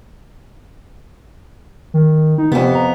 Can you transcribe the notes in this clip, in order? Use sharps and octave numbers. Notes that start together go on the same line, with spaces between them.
D#3
D#4
F2 C3 B3
A#5